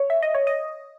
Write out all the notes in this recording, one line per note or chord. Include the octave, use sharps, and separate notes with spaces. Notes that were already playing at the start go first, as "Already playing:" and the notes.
Already playing: C#5
E5
D#5
C#5
D#5